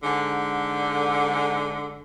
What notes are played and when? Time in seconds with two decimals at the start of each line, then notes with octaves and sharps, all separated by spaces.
0.03 G#2 D3